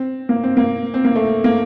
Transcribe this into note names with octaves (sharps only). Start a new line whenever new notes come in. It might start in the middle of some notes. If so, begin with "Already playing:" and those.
Already playing: C4
A#3
C4
A#3
C4
A#3
A3
A#3